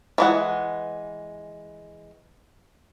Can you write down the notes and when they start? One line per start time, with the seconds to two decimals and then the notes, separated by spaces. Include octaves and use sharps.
0.18 E3 G#3 F#5